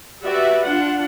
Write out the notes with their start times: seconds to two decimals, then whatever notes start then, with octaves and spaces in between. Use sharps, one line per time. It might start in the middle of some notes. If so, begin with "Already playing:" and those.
0.23 F#4 G4 B4 D5 E5
0.64 D4 F4 F#5